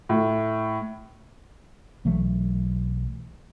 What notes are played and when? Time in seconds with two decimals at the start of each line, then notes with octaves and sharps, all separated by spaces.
0.09 A2
2.05 B1 E3 F#3 A3